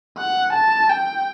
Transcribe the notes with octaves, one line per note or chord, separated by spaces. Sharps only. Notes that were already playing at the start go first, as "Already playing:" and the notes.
F#5
A5
G5